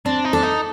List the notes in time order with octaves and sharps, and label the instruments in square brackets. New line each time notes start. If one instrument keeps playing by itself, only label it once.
[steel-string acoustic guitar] C4 [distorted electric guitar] D4
[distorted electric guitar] D#4
[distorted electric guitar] D4 [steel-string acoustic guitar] A4
[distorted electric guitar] D#4